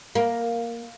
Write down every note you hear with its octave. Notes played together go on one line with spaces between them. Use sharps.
A#3